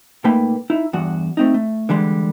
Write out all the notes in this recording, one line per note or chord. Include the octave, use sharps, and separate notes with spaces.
A#2 A3 A#3 D#4 B4 G5
D#4 E4
E2 G2 F#4 F#5
A3 C4 D#4
A3
D3 E3 G3 G#3